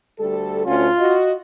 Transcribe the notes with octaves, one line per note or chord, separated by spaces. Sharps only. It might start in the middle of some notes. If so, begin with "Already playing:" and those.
D2 G3 A4
D2 C#4 F4
F#4 D#5